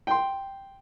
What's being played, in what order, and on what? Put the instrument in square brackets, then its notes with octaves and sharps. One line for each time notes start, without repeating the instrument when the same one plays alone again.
[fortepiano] G5 C6